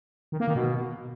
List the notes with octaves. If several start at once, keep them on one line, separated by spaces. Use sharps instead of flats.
D#3
A#3
D#3
B2